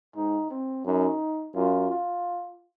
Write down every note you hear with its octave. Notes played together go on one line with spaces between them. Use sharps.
G#2 D#4
C4
F#2 D#4
F#2 F4
F4